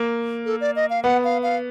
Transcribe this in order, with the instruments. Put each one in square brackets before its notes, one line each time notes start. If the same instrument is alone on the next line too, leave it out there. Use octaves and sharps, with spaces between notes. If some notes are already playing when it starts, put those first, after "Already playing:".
Already playing: [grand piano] A#3
[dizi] A4
D5
D#5
F5
[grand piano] B3 [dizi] F#5
[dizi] F5
F5